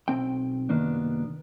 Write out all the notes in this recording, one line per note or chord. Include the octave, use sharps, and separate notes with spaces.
B1 C4 G5
C2 F#2 D#3 A#3 B3 D4